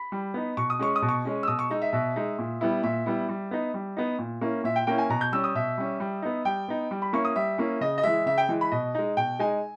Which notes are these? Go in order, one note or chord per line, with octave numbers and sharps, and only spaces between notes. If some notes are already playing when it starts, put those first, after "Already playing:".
Already playing: B5
G3
B3 D#4
B2 C#6
D#6
G#3 C#4 C#6
D#6
B2
C#6
G#3 C#4
E6
B2 D#6
C#6
G#3 D#4
E5
B2 E5
G#3 D#4
A#2
G3 B3 E4
A#2 E5
G3 B3 E4
G3
B3 D#4
G3
B3 D#4
A#2
A#3 C#4 E4
A#2 E5
G5
A#3 C#4 E4 G5
G#5
B2 A#5
G6
G3 C#4 E6
D#6
B2 E5
G3 C#4
G3
B3 D#4
G3 G5
B3 D#4
G3
B5
A#3 C#4 E4 C#6
D#6
G3 E5
A#3 C#4 E4
C#3 D#5
D#5
E3 G#3 E5
C#3 E5
G5
E3 G#3
B5
B2 D#5
G#3 D#4
B2 G5
G#3 D#4 G#5